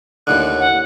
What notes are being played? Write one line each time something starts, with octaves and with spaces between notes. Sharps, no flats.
D#2 A2 D3 F#6
F#5